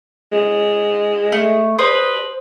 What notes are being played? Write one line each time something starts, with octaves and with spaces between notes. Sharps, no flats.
G#3
A3
B4 C5 D#6